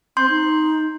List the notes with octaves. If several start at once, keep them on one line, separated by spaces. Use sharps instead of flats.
C4 C6 G6
D#4